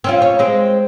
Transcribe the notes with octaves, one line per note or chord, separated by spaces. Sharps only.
C4 C#4 F4
C#5
G#3 C4